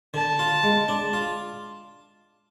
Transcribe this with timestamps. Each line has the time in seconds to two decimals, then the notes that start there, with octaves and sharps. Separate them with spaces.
0.14 D3 A5
0.39 F4
0.63 G#3
0.88 D4
1.13 F4